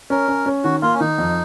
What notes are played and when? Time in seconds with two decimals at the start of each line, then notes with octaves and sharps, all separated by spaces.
0.10 C#4 A#4
0.28 C#4
0.46 C#4
0.64 D#3 F#4
0.82 A#3 F4
0.94 C#4
1.00 D#3 D#4
1.18 F2